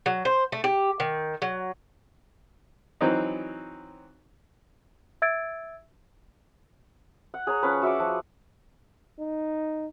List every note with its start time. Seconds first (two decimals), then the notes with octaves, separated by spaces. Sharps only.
0.06 F#3
0.25 C5
0.52 A3
0.64 G4
1.00 D#3
1.42 F#3
3.01 E3 F#3 C4 D#4
5.22 E5 E6 G#6 A6 D7
7.34 F#5
7.47 G#4 C#5 A#5
7.63 F3 C#4 B4
7.82 F#4 E5 C#6 D6
8.00 F3
9.20 D#4